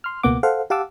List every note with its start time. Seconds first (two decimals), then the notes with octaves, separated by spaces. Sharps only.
0.04 C6 F6
0.23 C#2 B2 A#3 B3 F#5 D6
0.43 A4 C5 F5 F#5
0.70 G4 F5 F#5 A5 D6 E6